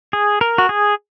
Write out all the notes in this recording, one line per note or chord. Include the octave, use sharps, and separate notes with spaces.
G#4
A#4
F#4
G#4